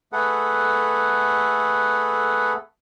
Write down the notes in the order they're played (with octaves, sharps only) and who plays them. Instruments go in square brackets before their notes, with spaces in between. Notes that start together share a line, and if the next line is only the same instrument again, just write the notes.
[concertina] A3 G#4 A4 B4 F#5